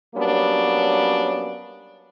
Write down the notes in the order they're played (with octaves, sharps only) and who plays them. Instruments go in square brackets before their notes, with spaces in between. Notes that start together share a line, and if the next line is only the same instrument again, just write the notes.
[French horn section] F#3 G3 A#3 B3 C#4 D4